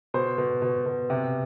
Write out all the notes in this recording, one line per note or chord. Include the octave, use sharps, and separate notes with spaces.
B2 C5
B2
B2
B2
C3